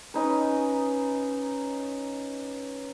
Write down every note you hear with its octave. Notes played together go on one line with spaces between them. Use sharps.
C#4 D#4 B4